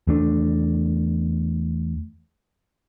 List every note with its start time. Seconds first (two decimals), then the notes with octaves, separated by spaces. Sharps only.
0.07 E2 A3 D4